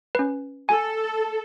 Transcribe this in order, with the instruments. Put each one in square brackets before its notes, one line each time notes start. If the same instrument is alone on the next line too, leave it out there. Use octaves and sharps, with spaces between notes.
[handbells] C#4 B4
[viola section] A4 [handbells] G#5